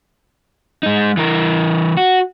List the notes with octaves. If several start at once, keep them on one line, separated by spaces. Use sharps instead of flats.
G#3 D#4
E3 A#4
F#4